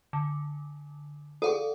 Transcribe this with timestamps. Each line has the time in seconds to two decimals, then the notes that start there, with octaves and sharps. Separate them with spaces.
0.13 D3
1.42 G#4 A4 D5 F5 F#5